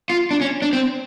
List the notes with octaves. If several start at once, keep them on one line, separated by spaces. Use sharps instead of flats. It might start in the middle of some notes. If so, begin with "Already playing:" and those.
F4
D4
C#4
D4
C4